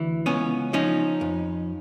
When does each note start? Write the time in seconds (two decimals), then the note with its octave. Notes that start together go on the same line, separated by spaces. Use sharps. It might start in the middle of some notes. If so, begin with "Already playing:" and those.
Already playing: D2 E3
0.26 C#2 B3 C#4
0.73 F3 C#4 D#4
1.21 F2